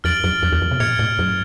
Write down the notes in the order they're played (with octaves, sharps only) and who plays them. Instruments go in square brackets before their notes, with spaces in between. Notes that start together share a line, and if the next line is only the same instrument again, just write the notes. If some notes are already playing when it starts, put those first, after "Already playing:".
[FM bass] F2 [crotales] F6 A6 D7 F#7
[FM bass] F#2
F2
E2
F2
B2
[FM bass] A#2 [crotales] F6 G#6 C#7 F7
[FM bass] A2
F#2